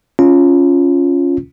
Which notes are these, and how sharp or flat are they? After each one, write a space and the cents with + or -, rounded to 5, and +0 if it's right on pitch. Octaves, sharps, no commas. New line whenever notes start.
C#4 +0 F4 +0